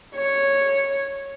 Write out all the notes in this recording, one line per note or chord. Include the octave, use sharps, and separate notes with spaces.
C#5